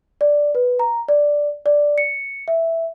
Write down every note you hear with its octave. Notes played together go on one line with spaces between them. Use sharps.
D5
B4
A#5
D5
D5
C#7
E5